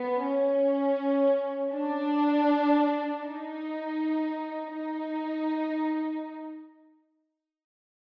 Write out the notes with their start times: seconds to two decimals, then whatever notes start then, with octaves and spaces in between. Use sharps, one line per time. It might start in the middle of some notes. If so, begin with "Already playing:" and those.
Already playing: B3
0.24 C#4
1.74 D4
3.25 D#4
4.75 D#4